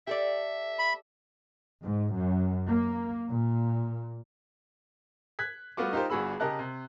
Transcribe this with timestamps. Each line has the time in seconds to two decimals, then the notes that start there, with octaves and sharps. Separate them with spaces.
0.07 G4 A4 D5 E5
0.79 B5
1.82 G#2
2.15 F#2
2.69 A#3
3.30 A#2
5.39 F#6 G#6 B6
5.77 G3 A3 B3 F4 F#4 D6
5.93 D#4 F4 G4 A#4 C5
6.10 G1 G2 F#4 G#4 B5 E6
6.40 C#3 G4 A#4 D#5 A5 F#6
6.59 C3